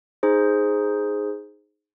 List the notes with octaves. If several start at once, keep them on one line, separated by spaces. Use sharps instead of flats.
D#4 G#4 C5